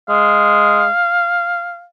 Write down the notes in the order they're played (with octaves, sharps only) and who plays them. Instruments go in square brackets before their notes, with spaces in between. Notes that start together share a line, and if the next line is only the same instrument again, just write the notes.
[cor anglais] G#3 [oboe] F5